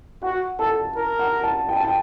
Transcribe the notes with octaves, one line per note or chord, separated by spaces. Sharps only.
F#4 F#5
A4 A5
A#4
F#5
A5
G5
A5
G5